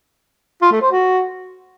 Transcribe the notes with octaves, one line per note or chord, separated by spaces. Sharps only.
F4
A3
C5
F#4